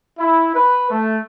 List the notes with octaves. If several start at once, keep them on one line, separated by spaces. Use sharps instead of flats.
E4
B4
A3